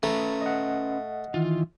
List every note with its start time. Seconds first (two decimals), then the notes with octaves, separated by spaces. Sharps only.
0.03 A3 C#4 B4 A#5
0.41 D#5 F#5
1.34 D#3 E3 F4